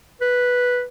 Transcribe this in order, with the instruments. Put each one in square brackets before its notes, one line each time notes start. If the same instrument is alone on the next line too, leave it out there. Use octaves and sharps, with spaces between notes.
[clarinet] B4